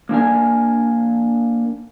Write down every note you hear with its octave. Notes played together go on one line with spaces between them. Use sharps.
A#3 D4 A#4 G#5